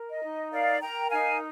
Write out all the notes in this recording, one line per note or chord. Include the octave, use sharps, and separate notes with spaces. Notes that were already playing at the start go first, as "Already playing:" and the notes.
Already playing: A#4
D#5
D#4
A#4 D5 F5
A#4 G5 A#5
D#4 F5 G#5